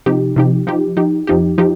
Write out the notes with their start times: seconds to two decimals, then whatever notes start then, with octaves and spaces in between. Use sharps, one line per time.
0.06 C3 F3 D#4 G4
0.36 C3 F3 D#4 G4
0.67 F3 D#4 G4
0.97 F3 D#4 G4
1.27 F2 F3 D#4 G4
1.58 F3 D#4 G4